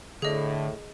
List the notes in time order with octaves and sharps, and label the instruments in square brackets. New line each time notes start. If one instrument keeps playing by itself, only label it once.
[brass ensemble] A2 [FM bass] D3 [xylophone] G#4 D#5